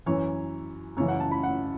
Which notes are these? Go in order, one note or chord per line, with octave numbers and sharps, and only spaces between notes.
F#2 E3 C#5
F#2 C#3 E3 C#5
F#5
A5
B5
F#5